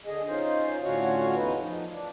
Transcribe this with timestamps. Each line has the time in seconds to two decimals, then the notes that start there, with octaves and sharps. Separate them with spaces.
0.06 D3 G#4 D#5
0.28 C#4 D#4 F4 C5
0.83 A2 D3 C#4 F4 F#4 C#5
1.35 E2 D#4 B4
1.59 F3 D#4
1.92 D4